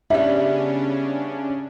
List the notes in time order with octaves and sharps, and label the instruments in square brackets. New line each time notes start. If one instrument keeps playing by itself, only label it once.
[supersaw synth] C#3 C#4 D4 [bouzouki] G3 B3 [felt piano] E5